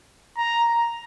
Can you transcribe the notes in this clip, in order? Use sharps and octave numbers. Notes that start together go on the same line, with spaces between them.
A#5